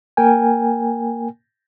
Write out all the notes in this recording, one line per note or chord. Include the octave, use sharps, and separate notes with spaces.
A#3 A#4 G5 G#5